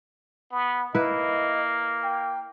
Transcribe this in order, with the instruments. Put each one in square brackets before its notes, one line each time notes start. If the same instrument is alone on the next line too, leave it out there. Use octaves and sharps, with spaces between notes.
[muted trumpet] B3
[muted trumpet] A#3 [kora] E4 B4 [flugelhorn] D#5
[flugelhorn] G5